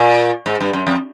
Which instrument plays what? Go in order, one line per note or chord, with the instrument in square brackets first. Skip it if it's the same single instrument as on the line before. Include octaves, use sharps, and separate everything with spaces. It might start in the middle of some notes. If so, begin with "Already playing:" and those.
Already playing: [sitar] A#2
G#2
G2
F#2
F2